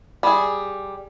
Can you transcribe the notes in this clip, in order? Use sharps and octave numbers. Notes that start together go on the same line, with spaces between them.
G3 G#4